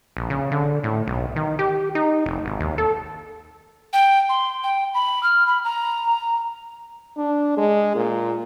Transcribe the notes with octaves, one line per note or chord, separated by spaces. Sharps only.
A#1
C#3
D3
A2
B1
D#3
G4
D#4
F1
G#1
D#2
A4
G5
C6
G5
B5
F6
B5
A#5
D4
G#3
A#2